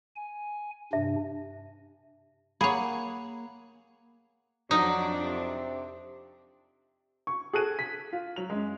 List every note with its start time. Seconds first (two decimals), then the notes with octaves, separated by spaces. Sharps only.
0.16 G#5
0.93 G2 C3 D4 E5
2.61 A#3 G#4 C#5 F#5 B5
4.71 F2 F#3 D4 D#4
5.23 C3
7.27 C#6
7.53 G#4 A4 F#6 D#7
7.79 B6
8.13 F4
8.36 F#3 F7
8.50 F#2 G#3